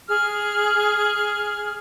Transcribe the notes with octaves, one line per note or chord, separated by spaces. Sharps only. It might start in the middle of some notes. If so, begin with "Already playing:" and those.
G#4 F6